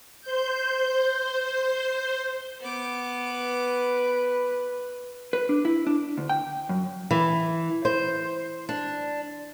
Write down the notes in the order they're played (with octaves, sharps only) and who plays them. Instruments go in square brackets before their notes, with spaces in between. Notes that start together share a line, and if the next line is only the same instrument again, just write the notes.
[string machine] C5 G6
[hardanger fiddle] B3 D6
[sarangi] B4
[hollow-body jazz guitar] B4
D4
E4
D4
D2
G5
F#2
[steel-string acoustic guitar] E3
C5
D4